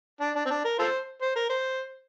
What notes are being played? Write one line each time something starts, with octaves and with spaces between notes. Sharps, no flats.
D4
D4
C4
D4
A#4
F4 A4 C5
C5
A#4
C5